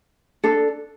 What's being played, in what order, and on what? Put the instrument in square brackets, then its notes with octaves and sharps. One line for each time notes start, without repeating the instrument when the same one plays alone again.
[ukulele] D4 A4